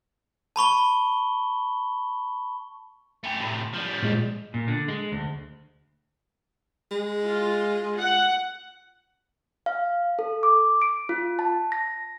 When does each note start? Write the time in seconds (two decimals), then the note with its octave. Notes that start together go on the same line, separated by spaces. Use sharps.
0.56 A5 B5 C#6 G7
3.24 A3 G4
3.40 A2 C3
3.74 F3 G3
4.03 A#2 G#3
4.54 A#2
4.68 D3
4.88 G#3
5.12 D2
6.91 G#3
7.26 F4
7.98 F#5
9.66 F5
10.19 A4
10.43 D6
10.82 D7
11.09 F4
11.39 A5
11.72 A#6